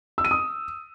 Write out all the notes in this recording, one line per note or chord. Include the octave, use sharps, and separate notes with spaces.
E6
D#7
D#6